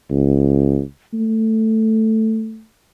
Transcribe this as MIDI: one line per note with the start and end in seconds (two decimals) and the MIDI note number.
0.10 0.82 37
1.13 2.64 57